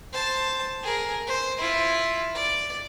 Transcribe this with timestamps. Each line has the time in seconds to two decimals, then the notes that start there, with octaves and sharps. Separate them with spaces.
0.13 C5 A5
0.83 G#4 A#4
1.27 C5
1.58 E4 F4
2.35 D5